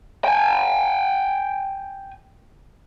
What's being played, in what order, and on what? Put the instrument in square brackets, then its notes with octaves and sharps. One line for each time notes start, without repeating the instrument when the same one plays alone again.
[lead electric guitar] G5 G#5